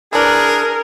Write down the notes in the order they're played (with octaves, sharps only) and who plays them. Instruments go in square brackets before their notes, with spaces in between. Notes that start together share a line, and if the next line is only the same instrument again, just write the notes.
[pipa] E3 D4 [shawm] G#4 [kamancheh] A#4